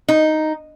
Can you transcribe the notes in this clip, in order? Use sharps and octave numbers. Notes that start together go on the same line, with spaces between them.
D#4